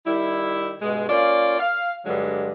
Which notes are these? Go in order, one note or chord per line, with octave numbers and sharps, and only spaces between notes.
D#3 G3 E4
G2 B2 G#3
A#3 C#4 F4 D5
F5
G2 D3 F#3 G#3 D4